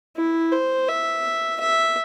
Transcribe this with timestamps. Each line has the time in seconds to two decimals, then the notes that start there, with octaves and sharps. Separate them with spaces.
0.16 E4
0.52 C5
0.88 E5
1.60 E5